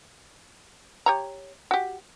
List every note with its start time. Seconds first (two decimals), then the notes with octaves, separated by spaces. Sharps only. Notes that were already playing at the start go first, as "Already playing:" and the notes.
1.06 G4 C#5 A#5
1.71 F#4 G4